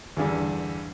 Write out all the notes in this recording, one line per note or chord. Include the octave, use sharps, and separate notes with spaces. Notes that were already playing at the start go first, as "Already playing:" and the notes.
E2 G2 D3